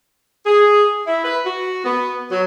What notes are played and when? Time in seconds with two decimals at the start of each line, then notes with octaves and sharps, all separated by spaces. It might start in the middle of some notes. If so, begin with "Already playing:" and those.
0.46 G#4
1.07 E4
1.24 B4
1.45 F#4
1.85 B3
2.31 F#3